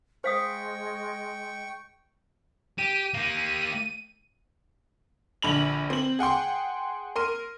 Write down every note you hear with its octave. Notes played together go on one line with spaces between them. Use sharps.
G#3 C5 F5 G5 C#6 D#6
G4 D#7
A#3 G4
A#1 D3 B5 F7 F#7
C4 F#7
G#4 F#5 G5 C6
A#4 C6 D#7